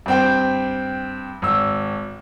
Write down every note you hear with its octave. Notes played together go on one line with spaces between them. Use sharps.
G2 C4 G5
G#1 E6